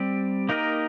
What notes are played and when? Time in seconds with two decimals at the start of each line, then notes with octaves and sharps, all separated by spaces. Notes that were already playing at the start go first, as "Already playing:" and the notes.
Already playing: G3 C4 G4 D5
0.49 A#3 D#4 G4 A#4 D#5